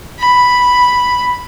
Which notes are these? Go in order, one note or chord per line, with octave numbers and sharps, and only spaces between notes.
B5